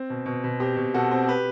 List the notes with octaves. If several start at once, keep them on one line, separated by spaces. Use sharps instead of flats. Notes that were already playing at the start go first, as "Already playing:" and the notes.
Already playing: C4
B2
B2
B2
C4 G4
B2
B2 F#4 A4
C4
G4 B4